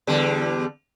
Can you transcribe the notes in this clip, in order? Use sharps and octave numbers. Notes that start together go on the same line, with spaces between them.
E2 D3 G3